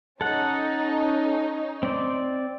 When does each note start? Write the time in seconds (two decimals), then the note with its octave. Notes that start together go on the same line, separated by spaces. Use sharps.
0.21 C#4 D#4 A4 F#5
1.83 C4 D5